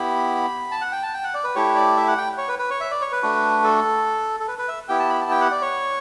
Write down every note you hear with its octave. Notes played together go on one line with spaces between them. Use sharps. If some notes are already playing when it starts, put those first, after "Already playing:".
Already playing: B3 E4 G4 B5
A5
F#5
G5
A5
G5
F#5
D5
B4
A3 E4 G4 C#5
D5
E5
F#5
G5
C#5
B4
B4
C#5
E5
D5
C#5
B4
A3 D4 F#4
A4
A4
B4
B4
E5
B3 E4 G4 G5
A5
B5
A5
G5
F#5
D5
C#5